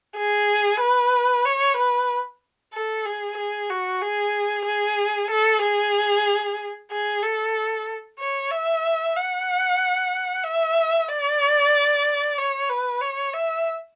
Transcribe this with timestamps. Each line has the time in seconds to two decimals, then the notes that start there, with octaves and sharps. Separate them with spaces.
0.17 G#4
0.80 B4
1.45 C#5
1.77 B4
2.73 A4
3.06 G#4
3.38 G#4
3.70 F#4
4.02 G#4
4.66 G#4
5.31 A4
5.63 G#4
6.91 G#4
7.23 A4
8.19 C#5
8.51 E5
9.16 F#5
10.44 E5
11.08 D5
12.38 C#5
12.70 B4
13.01 C#5
13.34 E5